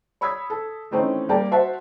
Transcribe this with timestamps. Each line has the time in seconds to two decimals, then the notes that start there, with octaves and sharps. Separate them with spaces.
0.21 C#5 B5 D#6 E6 G#6 B6
0.50 A4
0.91 D#3 E3 A3 C4 C#4 D#4
1.29 G3 A#3 D5 G5 A5
1.51 F#4 C5 E5 F#5 A5